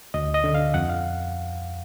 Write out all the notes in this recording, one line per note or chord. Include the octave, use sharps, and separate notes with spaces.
D2 D#5
D#5
D3
F5
F2 F#5
F5